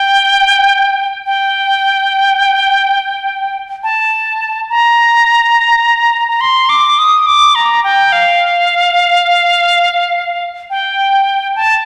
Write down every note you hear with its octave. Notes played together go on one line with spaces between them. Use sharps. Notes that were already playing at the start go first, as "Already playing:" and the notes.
Already playing: G5
G5
A5
A#5
A#5
C6
D6
D#6
D6
A#5
G5
F5
G5
A5